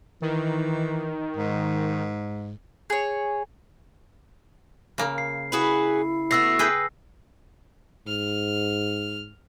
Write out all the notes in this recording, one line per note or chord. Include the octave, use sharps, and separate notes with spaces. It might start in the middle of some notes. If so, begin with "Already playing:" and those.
D#3 E3
G#2
G#4 C#5
C#3 A#3
C7
E4 F#4 G#4 B4
A3 B3 F#4 E6 A#6 C7
G#4 B4 G5
G#2 F6